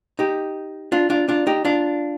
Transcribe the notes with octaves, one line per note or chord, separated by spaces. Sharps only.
D#4 G4
D4 F4
D4 F4
D4 F4
D#4 G4
D4 F4